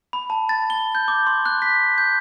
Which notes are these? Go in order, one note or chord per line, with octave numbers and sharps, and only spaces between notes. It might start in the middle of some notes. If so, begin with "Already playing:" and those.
B5
A5
A6
G7
G6
D6
C6
F#6
B6
G6